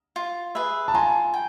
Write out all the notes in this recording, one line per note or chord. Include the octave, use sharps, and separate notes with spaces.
F4
G#4 B4 E5
A5
F4 G#5 A#5
G5